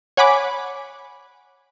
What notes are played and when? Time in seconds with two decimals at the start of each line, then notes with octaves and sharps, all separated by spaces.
0.17 C#5 F#5 G#5 B5 D6